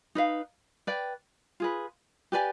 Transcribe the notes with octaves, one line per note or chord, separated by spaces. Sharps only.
D#4 B4 F5
B4 D5 G5
F4 G#4 B4
G4 B4 D5 G#5